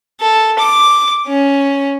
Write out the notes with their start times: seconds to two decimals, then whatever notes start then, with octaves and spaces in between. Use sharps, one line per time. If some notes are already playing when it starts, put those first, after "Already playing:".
0.20 A4
0.59 D6
1.26 C#4